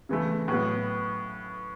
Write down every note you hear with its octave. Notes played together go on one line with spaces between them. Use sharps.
C#3 E3 A3
A2 F#3 B3